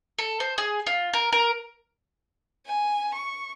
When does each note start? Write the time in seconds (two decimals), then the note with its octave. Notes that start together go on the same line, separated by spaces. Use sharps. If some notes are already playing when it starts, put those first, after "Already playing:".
0.19 A4
0.40 C5
0.58 G#4
0.87 F4
1.13 A#4
1.32 A#4
2.66 G#5
3.14 C#6